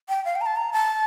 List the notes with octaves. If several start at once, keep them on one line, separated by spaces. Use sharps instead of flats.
G5
F5
G5
A#5
A5
A#5
A5